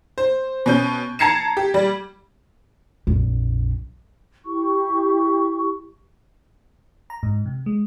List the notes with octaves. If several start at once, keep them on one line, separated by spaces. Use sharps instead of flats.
C5
B2 C#4 G6
A5 A#5 G#6 C7 C#7 E7
G4
G3
A#1 F2
E4 G4 C#6
A#5
G#2
C3
G#3